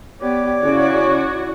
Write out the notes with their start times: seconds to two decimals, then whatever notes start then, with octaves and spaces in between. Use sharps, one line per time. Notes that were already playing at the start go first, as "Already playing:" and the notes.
0.20 B3 G4 C#5 D5 D6
0.62 C#3 C#4 E4 F#4